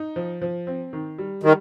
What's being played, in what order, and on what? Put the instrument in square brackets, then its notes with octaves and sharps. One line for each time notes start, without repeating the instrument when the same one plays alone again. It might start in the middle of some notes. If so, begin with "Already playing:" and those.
Already playing: [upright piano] D#4
F3
F3
C4
D#3
G3
[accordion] D#3 [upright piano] G3